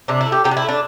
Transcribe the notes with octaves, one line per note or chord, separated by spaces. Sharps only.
C3 D4
E4
A3
G4
C3 G4
D4
E4
A3
D4